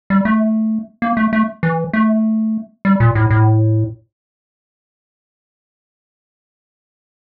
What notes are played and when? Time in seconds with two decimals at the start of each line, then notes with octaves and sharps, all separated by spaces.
0.10 G3
0.25 A3
1.02 A#3
1.17 A3
1.33 A3
1.63 E3
1.93 A3
2.85 G3
3.00 A#2
3.15 A2
3.31 A2